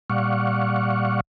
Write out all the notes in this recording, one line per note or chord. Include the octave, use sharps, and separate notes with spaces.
A#2 G3 D5 F5 F#5 C#6